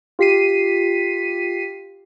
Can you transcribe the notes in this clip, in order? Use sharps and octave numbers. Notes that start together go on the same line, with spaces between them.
F4 G4 B6 C7 D#7